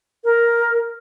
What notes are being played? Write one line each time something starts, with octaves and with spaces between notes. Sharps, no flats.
A#4